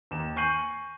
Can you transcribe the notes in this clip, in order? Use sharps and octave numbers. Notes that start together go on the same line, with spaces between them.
D#2 D#3 E7
G#5 C#6 G6 C7 D#7 F#7